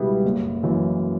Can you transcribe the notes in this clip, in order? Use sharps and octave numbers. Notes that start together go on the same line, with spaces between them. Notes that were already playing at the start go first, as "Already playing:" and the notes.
Already playing: C#2 B2 G3 B3 E4
F#1
F#2 E3